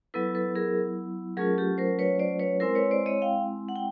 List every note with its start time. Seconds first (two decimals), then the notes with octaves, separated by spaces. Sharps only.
0.14 F#3 B3 E4 A4 B4
0.35 A4 B4
0.55 G#4 A#4
1.37 F#3 A3 C#4 F4 G#4 A#4
1.58 G4 A4
1.78 A#4 C5
1.99 B4 C#5
2.19 C5 D5
2.39 B4 C#5
2.60 G#3 C4 E4 A#4 C5
2.75 B4 C#5
2.91 C5 D5
3.06 C#5 D#5
3.22 F5 G5
3.69 F#5
3.76 G5